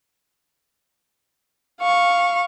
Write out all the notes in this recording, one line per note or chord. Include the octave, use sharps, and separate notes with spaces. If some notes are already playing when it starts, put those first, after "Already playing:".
F5 C#6